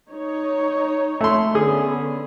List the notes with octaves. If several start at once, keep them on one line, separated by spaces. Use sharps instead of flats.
D#4 C#5
A3 C6
D3 B3 C#4 G#4